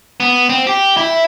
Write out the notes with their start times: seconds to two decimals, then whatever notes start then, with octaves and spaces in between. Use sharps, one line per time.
0.20 B3
0.50 C4
0.67 G4
0.97 E4